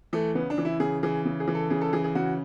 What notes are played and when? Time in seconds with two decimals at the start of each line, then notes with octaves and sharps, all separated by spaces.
0.13 E3 A3
0.35 C#3 B3
0.50 D4
0.58 E3
0.65 E4
0.80 C#3 G#4
1.03 E3 G#4
1.25 C#3
1.40 G#4
1.47 E3
1.55 A4
1.70 C#3 G#4
1.81 A4
1.93 E3 G#4
2.04 G#4
2.15 C#3 F#4